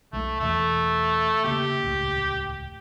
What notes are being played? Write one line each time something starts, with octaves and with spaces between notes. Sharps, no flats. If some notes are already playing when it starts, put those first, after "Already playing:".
B1 G#3 A3
E2 B2 E3 A3
C#3 A#3 G4
D#1 C#2 A2